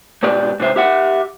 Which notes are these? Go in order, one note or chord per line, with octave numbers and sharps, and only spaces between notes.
G#2 B2 G4 D5
G#2 C3 C5 E5
G4 E5 F#5